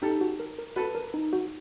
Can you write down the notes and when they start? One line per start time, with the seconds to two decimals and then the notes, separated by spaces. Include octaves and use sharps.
0.02 D#4 G4 A4
0.21 F#4
0.40 A#4
0.58 A#4
0.76 F#4 A4 B4
0.95 A#4
1.14 D#4
1.33 F#4